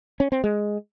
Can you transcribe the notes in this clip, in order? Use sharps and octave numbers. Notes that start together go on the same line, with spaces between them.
C#4
C4
G#3